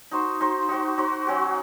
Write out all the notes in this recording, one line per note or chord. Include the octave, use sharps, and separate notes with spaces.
D#4 F#4 C5
D#4 F#4 C5
D#4 F#4 C5
D#4 F#4 C5
F#3 C#4 F#4